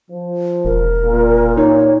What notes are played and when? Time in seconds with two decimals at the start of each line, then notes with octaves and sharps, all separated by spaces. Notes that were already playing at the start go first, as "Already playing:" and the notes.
0.10 F3
0.65 E1 A#4
1.03 A#2
1.57 D#4 C#5